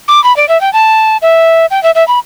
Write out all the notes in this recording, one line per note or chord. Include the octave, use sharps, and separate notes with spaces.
D6
B5
D5
E5
G5
A5
E5
G5
E5
E5
B5